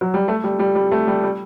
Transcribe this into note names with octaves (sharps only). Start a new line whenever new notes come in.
F#3
G3
A3
G3
G3
G3
A3
G3
G3